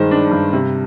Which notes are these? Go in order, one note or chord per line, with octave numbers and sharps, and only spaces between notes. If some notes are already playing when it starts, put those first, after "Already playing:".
Already playing: G2 D#3 G#3 C5
D4
G2
C3